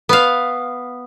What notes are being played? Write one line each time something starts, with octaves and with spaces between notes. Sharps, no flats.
B3 F5